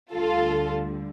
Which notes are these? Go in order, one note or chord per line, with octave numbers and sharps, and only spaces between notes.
D2 D3 G3 F4 A4